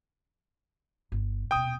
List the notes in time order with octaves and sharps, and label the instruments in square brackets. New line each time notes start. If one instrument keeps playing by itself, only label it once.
[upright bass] G1
[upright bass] D#1 B2 [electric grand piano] G5 D#6